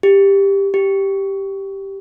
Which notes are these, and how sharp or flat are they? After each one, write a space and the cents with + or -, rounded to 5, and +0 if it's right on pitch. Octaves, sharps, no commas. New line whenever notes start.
G4 +10
G4 -5